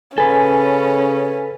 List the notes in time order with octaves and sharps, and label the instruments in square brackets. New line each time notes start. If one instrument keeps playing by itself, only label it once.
[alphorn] C#3 [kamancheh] C#4 [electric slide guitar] A4 B4 [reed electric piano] G#5